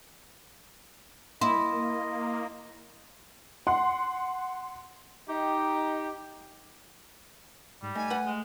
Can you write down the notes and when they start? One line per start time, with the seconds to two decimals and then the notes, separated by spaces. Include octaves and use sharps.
1.41 A#3 E4 D#5 C6
3.67 F#5 C6
5.28 D#4 G4
7.82 G#2 G3
7.95 A3 D#4 G#5
8.10 B4 F#5
8.26 G#3